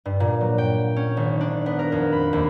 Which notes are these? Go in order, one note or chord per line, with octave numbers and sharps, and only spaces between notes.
G2
A#2
F#3
G5
C#4
G#1
D4
B3
A#4
F2
B5
D#2